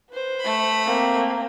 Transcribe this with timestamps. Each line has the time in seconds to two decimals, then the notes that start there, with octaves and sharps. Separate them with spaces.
0.11 B4 C5
0.41 A3 B5
0.86 A#3 C4